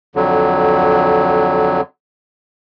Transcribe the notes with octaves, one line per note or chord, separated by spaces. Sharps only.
F2 D3 F#3